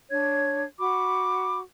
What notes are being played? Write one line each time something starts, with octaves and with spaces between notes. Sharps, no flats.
D4 C#5 G#6
F#4 B5 D6